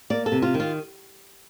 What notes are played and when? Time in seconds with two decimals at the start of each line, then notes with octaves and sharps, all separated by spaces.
0.10 A#3 D5
0.26 A4
0.32 C3
0.42 F4
0.54 D#3
0.60 F4